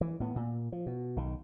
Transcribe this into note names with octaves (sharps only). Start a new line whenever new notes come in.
E3
A2 B3
A#2
F3
B2
B1 D#3